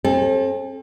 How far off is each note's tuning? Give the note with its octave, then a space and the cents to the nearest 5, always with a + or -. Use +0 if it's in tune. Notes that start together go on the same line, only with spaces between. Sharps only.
C4 +40 A4 -25